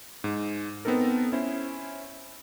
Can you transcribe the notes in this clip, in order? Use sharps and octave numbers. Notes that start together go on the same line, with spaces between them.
G#2
B3 C4 D#4 A4 A#4
C#4 E4 C5